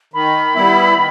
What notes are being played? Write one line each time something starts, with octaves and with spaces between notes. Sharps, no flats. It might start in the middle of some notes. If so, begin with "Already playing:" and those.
D#3 B5
G3 B3 E4
D#3